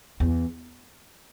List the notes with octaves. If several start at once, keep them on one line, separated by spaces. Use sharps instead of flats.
E2